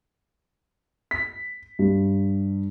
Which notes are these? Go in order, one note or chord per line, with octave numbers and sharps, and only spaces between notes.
B6
G2